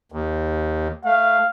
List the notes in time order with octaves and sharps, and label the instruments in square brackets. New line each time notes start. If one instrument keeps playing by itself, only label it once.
[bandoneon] D#2
[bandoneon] A3 [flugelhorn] F5